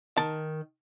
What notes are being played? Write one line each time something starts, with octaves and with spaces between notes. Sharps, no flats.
D#3 A5